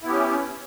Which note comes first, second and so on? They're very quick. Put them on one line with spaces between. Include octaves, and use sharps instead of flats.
E4 B3 G4 C#4